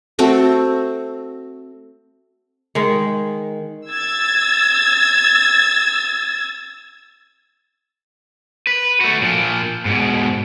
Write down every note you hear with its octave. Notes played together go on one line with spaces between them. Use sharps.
A3 C4 F#4
D#3 G#3
E6 G#6 A6
B4
A3 F#4
A#2 F3
G#2 B2